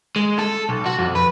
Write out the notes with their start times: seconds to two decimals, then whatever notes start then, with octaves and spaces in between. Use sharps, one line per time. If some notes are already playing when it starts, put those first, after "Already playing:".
0.16 G#3
0.39 A4
0.69 B1
0.86 F#4
0.99 F2
1.15 B4